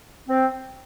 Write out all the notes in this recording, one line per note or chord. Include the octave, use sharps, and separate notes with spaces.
C4